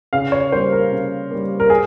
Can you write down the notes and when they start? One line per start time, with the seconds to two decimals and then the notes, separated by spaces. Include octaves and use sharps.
0.13 C#3 F5
0.32 C#5
0.52 G3 A#3 C5
0.72 A#4
0.92 C#3
1.31 G3 A#3
1.60 A#4
1.70 G#4